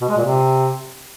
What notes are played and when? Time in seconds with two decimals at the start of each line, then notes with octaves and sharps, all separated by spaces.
0.01 B2
0.09 G#3
0.17 A#2
0.25 C3